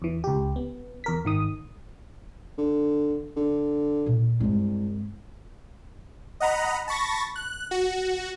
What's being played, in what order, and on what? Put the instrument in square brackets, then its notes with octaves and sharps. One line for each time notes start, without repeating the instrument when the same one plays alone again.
[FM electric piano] E2 E3
C#2 G4
B3
E2 A#4 B6
G#1 D#3 D#6
[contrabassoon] D3
D3
[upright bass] A#2
[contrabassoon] C2 [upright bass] G2 G#3
[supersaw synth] D#5 F#5 A#5 B5
A5 B5 C#6 A6 A#6
F#6
F#4